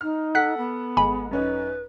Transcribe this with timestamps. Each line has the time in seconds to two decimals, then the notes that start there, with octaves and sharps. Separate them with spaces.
0.01 D#4 F6
0.35 A4 F#5 F#6 B6
0.57 B3
0.97 G#1 G#3 G#5 B5
1.31 F#2 C#4 D#4 B4